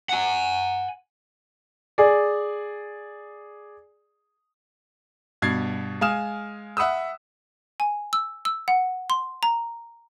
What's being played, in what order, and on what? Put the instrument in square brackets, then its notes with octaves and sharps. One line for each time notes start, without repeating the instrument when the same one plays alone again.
[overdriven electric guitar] F#5 G#5
[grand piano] G#4 D5
G2 B2 G#6 A6 C7
G#3 F5 G#5 D#6 F6 E7
E5 F#5 B5 D#6 E6
[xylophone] G#5
E6
E6
F#5
C6
A#5